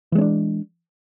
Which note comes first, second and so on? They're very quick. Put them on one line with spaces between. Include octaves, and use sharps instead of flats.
E3 G#3 C#4 D4